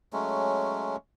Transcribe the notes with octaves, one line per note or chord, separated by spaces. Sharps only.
F#3 G#3 A3 C#4